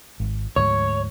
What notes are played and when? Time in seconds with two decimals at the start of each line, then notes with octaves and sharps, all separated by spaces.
0.20 G#1
0.56 D2 G#2 F3 C#5